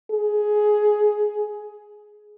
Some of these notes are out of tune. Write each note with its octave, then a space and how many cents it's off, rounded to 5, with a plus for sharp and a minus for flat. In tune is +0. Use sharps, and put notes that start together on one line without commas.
G#4 +15